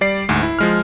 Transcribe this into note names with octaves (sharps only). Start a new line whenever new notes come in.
G3 D5 C7
D2 G#2
E4
F3 G#3 F6